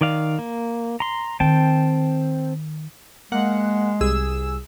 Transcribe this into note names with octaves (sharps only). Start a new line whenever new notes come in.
D#3 D5 F5
A#3
A#5 C6
D#3 C4 G5 A5
G#3 A#3 F#5
C2 G#4 E6